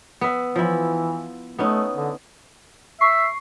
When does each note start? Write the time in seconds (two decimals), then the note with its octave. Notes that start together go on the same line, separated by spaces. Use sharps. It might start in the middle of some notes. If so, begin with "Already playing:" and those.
0.21 B3 E5
0.56 E3 F3 E4
1.59 A3 B3 C#4 D#4
1.96 D3
3.01 E5 C#6 C7